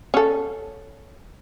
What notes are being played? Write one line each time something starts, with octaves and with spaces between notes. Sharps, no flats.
C#4 A4